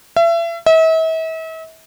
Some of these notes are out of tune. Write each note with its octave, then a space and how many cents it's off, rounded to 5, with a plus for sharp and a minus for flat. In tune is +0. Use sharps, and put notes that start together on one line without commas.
E5 +35
E5 -40